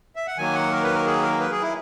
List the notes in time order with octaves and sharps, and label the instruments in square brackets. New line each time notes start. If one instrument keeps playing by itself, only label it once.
[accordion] E5
F#5
D#3 F#3 A#3 G#5
F#5
A#4
B4
A#4
G#4
A#4
B4
G#4
E4